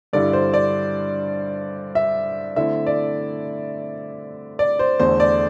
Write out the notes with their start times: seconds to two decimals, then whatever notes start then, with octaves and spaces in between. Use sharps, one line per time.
0.13 G2 D3 G3 E4 D5
0.33 C5
0.54 D5
1.95 E5
2.56 D3 A3 C4 E4 E5
2.87 D5
4.59 D5
4.79 C5
4.99 E2 D3 A3 C5
5.20 D5